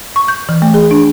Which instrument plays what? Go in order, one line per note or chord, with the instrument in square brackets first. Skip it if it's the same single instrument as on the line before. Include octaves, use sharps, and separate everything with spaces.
[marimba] C#6
G6
E3
A3
G#4
D4